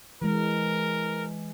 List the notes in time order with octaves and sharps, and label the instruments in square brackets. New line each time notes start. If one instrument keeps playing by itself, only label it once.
[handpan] E3 G#3 [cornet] A#4